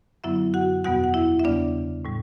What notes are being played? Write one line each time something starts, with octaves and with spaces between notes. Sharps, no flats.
F#2 D3 F#3 B3 E4 E5
F#4 F#5
E2 B2 G3 B3 F#4 F#5
F#5
E4 E5
E5
E2 C#3 G3 B3 D4 D5
A2 G3